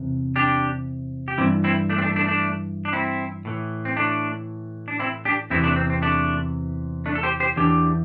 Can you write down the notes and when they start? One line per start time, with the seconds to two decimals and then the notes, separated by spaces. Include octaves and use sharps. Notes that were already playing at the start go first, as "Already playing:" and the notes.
Already playing: E2 C3
0.36 D4 G4
1.28 G4
1.38 G2 E3 C4 E4
1.64 C4 E4
1.90 A3 D4
1.98 C4
2.02 A3 D4
2.16 A3 D4
2.28 A3 D4
2.85 D4
2.93 C4 E4
3.45 A2 E3
3.85 C4
3.97 A3 D4
4.88 D4
4.99 C4 E4
5.25 D4 G4
5.50 E2 C3 E3 C4 E4
5.64 A3 D4
5.76 C4
5.90 C4
6.02 A3 D4
7.06 A3 D4
7.15 A4
7.23 G4 C5
7.40 G4 C5
7.56 E2 E3 D4 G4